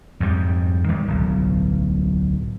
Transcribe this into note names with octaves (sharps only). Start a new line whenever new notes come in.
F2 G#2 B2 G3
D#3 G3 G#3
D1 B1